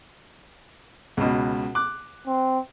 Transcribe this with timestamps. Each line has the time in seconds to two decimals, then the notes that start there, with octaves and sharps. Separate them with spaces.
1.17 C#2 B2
1.75 D6 F#6
2.27 C4